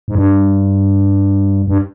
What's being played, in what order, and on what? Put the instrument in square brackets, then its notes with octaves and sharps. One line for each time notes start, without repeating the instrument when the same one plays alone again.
[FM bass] G#2
G2
G2